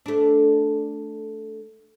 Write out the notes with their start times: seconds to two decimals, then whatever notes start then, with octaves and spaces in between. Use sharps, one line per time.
0.06 A3 D4